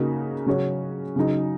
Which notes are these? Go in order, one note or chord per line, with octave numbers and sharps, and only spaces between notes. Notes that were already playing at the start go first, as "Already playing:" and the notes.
Already playing: C#3 A#3 D#4 F#4
C#3 F#3 C#4 F#4 C#5
C#3 F#3 D#4